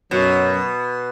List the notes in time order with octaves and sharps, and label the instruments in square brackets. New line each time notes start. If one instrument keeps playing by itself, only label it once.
[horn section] F#2 F#3 [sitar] B2